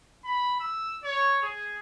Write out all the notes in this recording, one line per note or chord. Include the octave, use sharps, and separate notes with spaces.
B5
E6
C#5
G#4